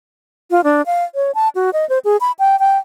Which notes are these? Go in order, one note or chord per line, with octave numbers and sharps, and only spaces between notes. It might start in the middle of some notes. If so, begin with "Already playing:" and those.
F4
D4
F5
C#5
A5
F#4
D#5
C5
G#4
B5
G5
G5